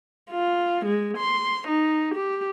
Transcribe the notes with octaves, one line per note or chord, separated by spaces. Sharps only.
F4
G#3
C6
D#4
G4